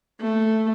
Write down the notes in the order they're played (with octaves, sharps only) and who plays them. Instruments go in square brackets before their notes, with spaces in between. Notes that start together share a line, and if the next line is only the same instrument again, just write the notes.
[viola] A3